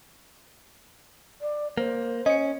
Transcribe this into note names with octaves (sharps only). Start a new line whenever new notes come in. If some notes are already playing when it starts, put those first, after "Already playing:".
D5
A#3 C5
C#4 D#5 C#7